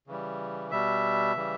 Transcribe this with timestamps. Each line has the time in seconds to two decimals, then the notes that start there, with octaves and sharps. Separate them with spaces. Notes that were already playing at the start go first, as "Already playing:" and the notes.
0.07 C#3 E3 G3
0.71 B2 G3 E5
1.35 C#3 E3 G3